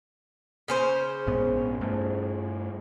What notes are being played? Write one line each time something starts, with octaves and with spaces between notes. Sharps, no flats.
C#3 C#4 C5
A#1 G#2 B3
G2 A3